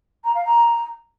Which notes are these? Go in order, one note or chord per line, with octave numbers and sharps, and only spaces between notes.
A#5
F5
A#5